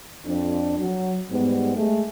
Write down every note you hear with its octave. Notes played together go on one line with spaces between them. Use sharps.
F2 D4
F#3
G#2 G3 B3
G#3 A3